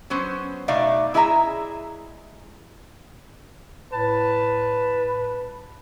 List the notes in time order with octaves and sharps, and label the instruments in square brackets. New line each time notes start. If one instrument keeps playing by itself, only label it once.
[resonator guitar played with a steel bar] F#3 B3 C#4 C5
B2 A3 D#4 D5 E5 F5
G#3 E4 G#4 E5 F#5 A#5
[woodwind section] A2 A5 [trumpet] B4